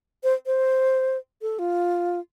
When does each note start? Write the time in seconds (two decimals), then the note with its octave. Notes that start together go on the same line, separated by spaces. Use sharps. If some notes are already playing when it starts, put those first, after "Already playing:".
0.24 C5
0.46 C5
1.42 A4
1.59 F4